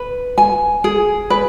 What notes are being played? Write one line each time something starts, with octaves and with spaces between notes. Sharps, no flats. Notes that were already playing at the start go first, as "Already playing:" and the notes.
Already playing: B4
G#5
G#4
B4